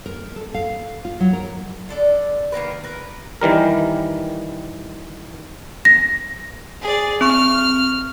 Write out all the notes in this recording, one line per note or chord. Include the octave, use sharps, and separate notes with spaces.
A#4
A4
F5
F4
F#3
A#4
D3 A4 D5
D#3 A#3 A#4 B4
A#4 B4
D#3 E3 G3 A#4
A#6
G#4 D5
C4 C#6 F6